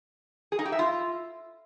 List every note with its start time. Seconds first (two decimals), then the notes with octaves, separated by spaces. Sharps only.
0.52 G#4
0.59 D#4
0.65 G4
0.72 E5
0.79 F4